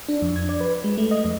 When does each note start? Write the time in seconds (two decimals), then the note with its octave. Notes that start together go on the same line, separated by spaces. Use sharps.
0.09 D4
0.22 F2
0.36 G#6
0.49 D5
0.61 B4
0.84 G#3
0.98 A3
1.11 D#5
1.25 F2